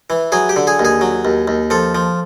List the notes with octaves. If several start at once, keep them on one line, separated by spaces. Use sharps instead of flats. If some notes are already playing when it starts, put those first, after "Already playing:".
E3
F#3 G#4
G4
D3
G#4
D#2
G#4
F#3
D#2
D#2
F3 A4
F3